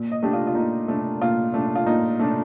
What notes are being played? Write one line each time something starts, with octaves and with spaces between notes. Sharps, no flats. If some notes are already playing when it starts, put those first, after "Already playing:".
Already playing: A#2
D#5
A3 D4 G4
F4
F4
A#2 D#4
A3 D4
A#2 F4
A3 D4
F4
A#2 D#4
A3 D4